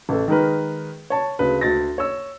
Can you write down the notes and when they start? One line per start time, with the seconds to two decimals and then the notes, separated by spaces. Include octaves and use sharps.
0.09 A1 A4
0.28 D#3 G#3 A#4 B4
1.10 C#5 A5
1.39 D2 C#3 B4
1.61 D2 A6 A#6
1.98 C#5 E6